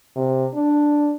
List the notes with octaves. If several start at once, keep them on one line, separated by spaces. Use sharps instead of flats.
C3
D4